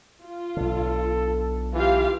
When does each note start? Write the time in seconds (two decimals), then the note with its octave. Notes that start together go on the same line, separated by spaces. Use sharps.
0.23 F4
0.57 B1 D3 A4
1.73 E3 F4 G4 F5